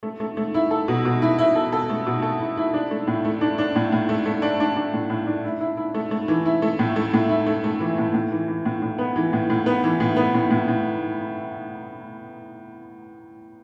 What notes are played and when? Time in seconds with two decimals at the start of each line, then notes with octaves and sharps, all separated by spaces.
0.03 A3
0.20 A3
0.37 A3
0.54 E4
0.71 A4
0.88 B2
1.05 B2
1.22 E4
1.38 E4
1.56 A4
1.73 A4
1.90 A3
2.06 B2
2.22 A4
2.40 E4
2.57 E4
2.74 D4
2.91 A3
3.07 A2
3.25 A3
3.41 D4
3.58 D4
3.76 A2
3.92 A2
4.09 A3
4.26 A3
4.42 D4
4.60 D4
4.76 D4
4.93 A2
5.10 A2
5.27 D4
5.44 E4
5.60 E4
5.77 E4
5.94 A3
6.11 A3
6.28 E3
6.45 E4
6.62 A3
6.79 A2
6.96 A3
7.14 A2
7.29 E4
7.46 A3
7.64 A3
7.80 E3
7.98 A2
8.14 A2
8.32 E3
8.48 E3
8.65 A2
8.82 A2
8.98 B3
9.16 E3
9.33 A2
9.50 A2
9.66 B3
9.84 E3
10.00 A2
10.16 B3
10.34 A2
10.51 A2
10.68 A2